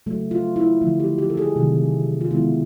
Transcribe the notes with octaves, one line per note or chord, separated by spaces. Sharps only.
C#3 F#3 A3
F4
E4
D3 F3 A3
G4
G4
A4
G#4
C3 D#3 F#3 A3
F4
D#3 G#3 B3 E4